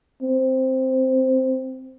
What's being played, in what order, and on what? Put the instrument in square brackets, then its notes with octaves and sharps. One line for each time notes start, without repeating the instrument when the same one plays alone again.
[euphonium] C4